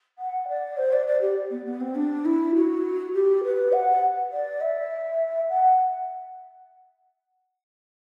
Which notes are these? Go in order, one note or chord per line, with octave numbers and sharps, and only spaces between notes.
F#5
D5
C5
D5
D5
G4
B3
B3
C4
D4
E4
F#4
G4
B4
F#5
D5
E5
F#5